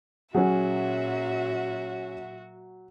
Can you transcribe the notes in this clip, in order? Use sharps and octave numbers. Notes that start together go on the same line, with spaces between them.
A#2 F#3 C#4 F#4 G#4 E5